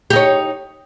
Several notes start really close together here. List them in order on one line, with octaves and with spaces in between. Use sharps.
G4 D#4 C#5